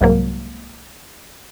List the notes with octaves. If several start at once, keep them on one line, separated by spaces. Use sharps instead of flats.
C2 G#2 F#3 A#3